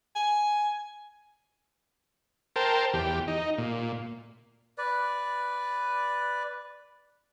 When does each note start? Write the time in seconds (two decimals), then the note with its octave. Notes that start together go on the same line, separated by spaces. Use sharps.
0.16 G#5
2.56 A#4 C5 G5 A5
2.93 E2 G4
3.28 D#4
3.58 A#2
4.78 B4 D5